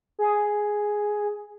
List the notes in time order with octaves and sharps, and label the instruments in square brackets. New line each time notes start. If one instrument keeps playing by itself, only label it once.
[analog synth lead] G#4